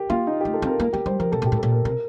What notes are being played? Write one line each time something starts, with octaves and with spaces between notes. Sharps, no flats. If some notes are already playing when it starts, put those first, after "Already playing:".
Already playing: G4 A#4
A#3 F4
D#4
A3 G4
A4
C4 A#4
A#3 A#4
A#3 G4
G3 C5
F3 A#4
C3 A4
A#2 G4
A2
A#2 A4
A#4
C3 A#4